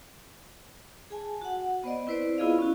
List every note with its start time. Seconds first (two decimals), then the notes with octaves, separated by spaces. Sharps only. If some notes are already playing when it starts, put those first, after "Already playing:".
1.10 G#4 G#5 A5
1.42 F#4 F#5
1.84 B3 C5 D5 D#5
2.07 C4 E4 B4 C5 D5
2.38 B3 E4 F4 G#4 D#5 F5
2.59 C#4 E4 F#4